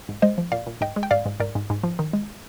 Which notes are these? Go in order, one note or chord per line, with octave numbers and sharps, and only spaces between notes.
G#2
G#3 C5 D#5
F3
A#2 D5 F5
A#2
G#2 D#5 G5
G#3
G5
G#2 D5 F5
G#2
G#2 A#4 D5
G#2
G#2
F3
D#3
G#3